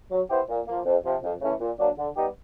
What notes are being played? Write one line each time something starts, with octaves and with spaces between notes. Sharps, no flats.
F#3
B3 E4 G4 C5
A#2
F3 A#3
F2
C3 F3
F2
C#3 E3 A3 C#4
A#2
F#3 A#3 D4
D3
G3 B3 D#4 G4